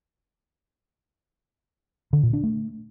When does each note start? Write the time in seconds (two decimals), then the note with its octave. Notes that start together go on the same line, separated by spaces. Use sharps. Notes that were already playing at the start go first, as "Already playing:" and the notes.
2.13 D3
2.23 A#2
2.33 D4
2.44 A3